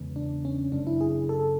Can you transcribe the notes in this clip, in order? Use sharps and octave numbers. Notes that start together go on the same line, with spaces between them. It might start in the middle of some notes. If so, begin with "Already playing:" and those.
Already playing: E2 C#3 G#3 B3
D4
C#4
F#1 F#2 C#3 G#3 D4
E4
G#4
A4